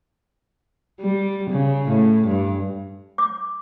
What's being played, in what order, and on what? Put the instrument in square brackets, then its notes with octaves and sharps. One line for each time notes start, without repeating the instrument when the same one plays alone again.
[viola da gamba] G3
C#3
A2
G2
[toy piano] D6